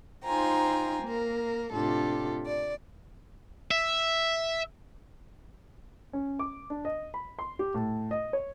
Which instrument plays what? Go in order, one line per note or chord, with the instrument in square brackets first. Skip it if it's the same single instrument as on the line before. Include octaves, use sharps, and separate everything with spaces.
[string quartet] D#4 F4 C5 G5 G#5 A#5
A#3 A#4
A2 C3 D4 F4 G4 A4
D5
[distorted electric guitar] E5
[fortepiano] C#4
D6
D4
D#5
B5
C6
G4
A2
D#5
C#5